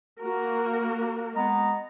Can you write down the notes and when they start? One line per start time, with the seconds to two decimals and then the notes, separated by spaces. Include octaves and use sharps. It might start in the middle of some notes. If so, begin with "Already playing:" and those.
0.21 A#3 F#4 A#4
1.35 G#3 B3 A#5